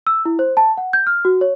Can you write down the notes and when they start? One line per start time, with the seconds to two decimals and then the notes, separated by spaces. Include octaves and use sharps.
0.07 E6
0.25 E4
0.39 C5
0.57 A5
0.77 F#5
0.93 G6
1.07 F6
1.25 F#4
1.41 C#5